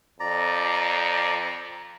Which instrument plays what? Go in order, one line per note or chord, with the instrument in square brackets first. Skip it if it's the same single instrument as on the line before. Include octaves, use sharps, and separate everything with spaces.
[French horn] F2 [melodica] D5 A#5